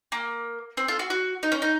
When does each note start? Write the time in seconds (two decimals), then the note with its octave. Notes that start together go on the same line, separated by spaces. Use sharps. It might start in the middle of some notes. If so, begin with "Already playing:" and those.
0.12 A#3
0.77 C4
0.88 F4 A4
0.99 F#4
1.10 F#4
1.43 D#4
1.52 C#4
1.62 D#4